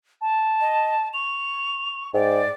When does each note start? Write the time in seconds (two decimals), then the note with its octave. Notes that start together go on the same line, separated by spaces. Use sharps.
0.21 A5
0.61 D#5
1.14 C#6 F7
2.14 G#2 D5 G5